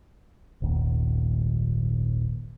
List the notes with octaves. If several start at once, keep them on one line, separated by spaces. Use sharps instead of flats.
D#1 G#1 D#2